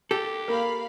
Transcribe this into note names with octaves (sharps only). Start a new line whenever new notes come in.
G4 A4
A#3 F5 B5